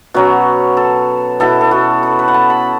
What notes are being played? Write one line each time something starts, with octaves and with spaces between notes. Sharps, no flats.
B2 F#3 C#4 F#4
A4
B2 B3 E4 A4
A4
F#4
A4
B4
F#5
A5
B5